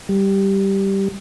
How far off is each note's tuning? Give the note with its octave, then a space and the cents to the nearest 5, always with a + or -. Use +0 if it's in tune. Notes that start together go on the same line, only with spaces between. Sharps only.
G3 -5